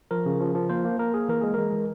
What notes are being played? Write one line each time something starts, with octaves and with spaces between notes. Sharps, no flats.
F3 A#4
C#3
F3
F3
A#3 C5
A#3
A#3 A#4
A#3 G#4
E3 A#4
G#3 G#4
G#3 A#4
E3